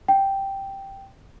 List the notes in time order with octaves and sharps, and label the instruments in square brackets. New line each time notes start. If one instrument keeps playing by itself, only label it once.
[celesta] G5